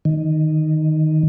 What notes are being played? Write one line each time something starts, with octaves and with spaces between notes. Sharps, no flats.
D#3